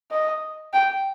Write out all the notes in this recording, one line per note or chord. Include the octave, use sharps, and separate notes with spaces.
D#5
G5